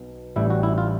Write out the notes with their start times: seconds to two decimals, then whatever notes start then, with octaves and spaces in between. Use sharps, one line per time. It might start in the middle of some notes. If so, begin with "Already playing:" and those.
Already playing: B1 B2
0.36 A1 A2 E3 G3 E4
0.50 F#4
0.63 E4
0.78 F4